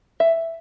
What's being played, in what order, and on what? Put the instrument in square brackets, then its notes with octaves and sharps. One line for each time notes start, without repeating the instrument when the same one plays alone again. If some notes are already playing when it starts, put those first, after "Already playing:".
[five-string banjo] E5